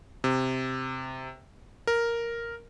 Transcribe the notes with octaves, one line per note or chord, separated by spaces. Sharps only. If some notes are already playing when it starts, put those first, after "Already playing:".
C3
A#4